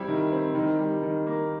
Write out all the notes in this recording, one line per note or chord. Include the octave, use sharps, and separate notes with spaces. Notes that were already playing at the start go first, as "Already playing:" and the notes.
Already playing: G3 C4 E4
D#3
C4
D#3
G3
D#3
A#3